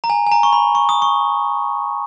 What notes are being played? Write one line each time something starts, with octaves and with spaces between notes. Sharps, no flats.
A#5
G#5
G#5
A#5
C#6
B5
C#6
D#6
C#6